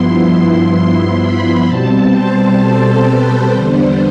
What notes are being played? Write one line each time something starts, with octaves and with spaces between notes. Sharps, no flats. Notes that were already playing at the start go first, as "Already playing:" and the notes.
Already playing: G2 F3 B3 E4 C6
C6
C6
B5
B2 G3 C4 A5
C5
A4
B4
E2 D3 G3 B3 D4 C5